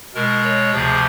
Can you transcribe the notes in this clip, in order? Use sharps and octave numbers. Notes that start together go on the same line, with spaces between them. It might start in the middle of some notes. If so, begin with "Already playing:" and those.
B2 G#3 A#4
C#5
D2 C3 F3 G#4